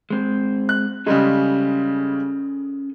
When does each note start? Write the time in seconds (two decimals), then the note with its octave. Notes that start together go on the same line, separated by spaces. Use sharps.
0.10 G#3 C4
0.69 F#6
1.06 C#3 G3 G#3 C#4 G#4 A4